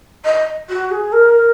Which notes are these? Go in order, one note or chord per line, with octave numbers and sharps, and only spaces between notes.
D#5
F#4
G#4
A#4